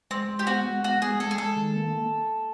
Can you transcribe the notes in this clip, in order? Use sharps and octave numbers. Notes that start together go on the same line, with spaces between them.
G#3 C4
G#3
G4
B3 F#4
G#3
B3 F#4
G#3 G#4
G#3 A4
G#4
G#3 A4
D#3
A#3